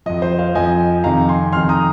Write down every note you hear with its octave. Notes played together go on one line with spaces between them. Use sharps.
F2 F3 D#5
C5
C5 F5
F2 F3 D#5 G#5
F2 C3 D#3 F5 A#5
G#5 C6
F2 C3 D#3 C6 F6
A#5 D#6